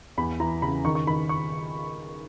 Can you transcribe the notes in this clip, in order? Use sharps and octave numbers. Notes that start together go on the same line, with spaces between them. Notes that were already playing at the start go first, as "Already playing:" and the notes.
E2 B5
E3 A#5
C#3 B5
D#3 C#6
C#6
D#3 B5
C#6